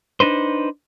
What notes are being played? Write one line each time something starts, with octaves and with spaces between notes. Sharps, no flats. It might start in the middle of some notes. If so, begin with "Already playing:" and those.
D4 D#4 B4 C5